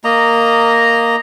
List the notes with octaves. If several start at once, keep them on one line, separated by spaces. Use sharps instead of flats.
A#3 D#5 A#5